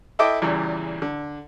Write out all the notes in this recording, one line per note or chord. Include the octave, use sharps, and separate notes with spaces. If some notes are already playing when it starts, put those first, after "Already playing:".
E4 A4 D#5 E5 G5 D6
E2 A#2 C#3 E3 G3
D3